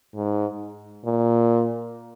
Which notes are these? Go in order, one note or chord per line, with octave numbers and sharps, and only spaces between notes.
G#2
A#2